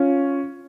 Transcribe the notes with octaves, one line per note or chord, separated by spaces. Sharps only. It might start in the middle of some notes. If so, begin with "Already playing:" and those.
Already playing: C#4 F4